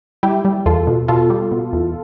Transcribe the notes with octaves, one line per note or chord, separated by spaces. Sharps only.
G3 E4 G4
G3
E2 F4 A4
B2
B2 F4 A4
G3
B2
E2